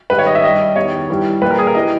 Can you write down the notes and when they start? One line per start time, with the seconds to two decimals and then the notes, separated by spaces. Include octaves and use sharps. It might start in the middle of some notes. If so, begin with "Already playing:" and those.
0.10 G#2 D#3 G3 B4
0.18 C#5
0.27 D#5
0.35 E5
0.44 G2 G3 D#5
0.76 E2 D#3 G3 C#5
1.10 G2 E3 G3
1.42 A#2 G3 B4
1.50 A#4
1.58 G#4
1.67 A#4
1.74 E3 G3 D#5